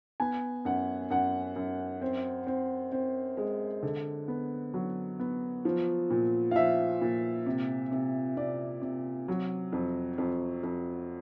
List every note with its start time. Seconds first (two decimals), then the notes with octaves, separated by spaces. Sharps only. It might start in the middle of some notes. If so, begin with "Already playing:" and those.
0.20 B3 G#5
0.65 F#2 F#5
1.10 F#2 F#5
1.56 F#2
2.02 C4
2.47 C4
2.92 C4
3.37 G#3
3.83 D3
4.28 B3
4.74 F#3
5.19 B3
5.65 F3
6.10 A#2
6.51 F5
6.56 F3 E5
7.01 A#2
7.46 C3
7.92 C3
8.37 C3 D5
8.82 C3
9.28 F#3
9.73 F2
10.18 F2
10.63 F2